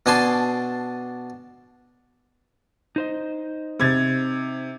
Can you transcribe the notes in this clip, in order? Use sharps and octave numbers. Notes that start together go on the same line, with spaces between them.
B2 D4 G#5 A5 C6
D#4 C5 D#5
C3 G#6 A6